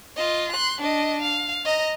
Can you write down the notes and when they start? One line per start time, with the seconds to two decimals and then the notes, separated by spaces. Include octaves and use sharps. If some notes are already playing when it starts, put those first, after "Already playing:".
0.16 F4 D#5
0.52 C6 F#6
0.81 D4 D#5
1.22 F5
1.65 D#5 A#5